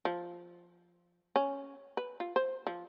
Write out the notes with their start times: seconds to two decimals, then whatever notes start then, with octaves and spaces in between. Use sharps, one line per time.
0.05 F3
1.36 C#4
1.97 B4
2.20 F4
2.36 C5
2.67 F3